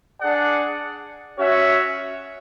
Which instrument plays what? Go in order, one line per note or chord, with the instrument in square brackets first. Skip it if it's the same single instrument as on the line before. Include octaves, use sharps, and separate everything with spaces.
[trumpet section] D4 G#4 D5 F#5
C#4 F#4 C#5 E5